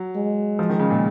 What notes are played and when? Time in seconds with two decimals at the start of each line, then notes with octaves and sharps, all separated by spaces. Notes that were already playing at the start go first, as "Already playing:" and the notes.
Already playing: F#3
0.16 G#3
0.59 F3
0.69 D#3
0.79 C#3
0.90 A#2